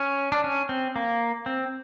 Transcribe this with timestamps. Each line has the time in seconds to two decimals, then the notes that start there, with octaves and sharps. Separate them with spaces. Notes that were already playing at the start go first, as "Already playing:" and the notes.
Already playing: C#4
0.32 D4
0.44 C#4
0.69 C4
0.96 A#3
1.46 C4